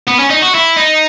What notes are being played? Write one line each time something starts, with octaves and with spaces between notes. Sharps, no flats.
B3
C#4
D#4
F#4
E4
D#4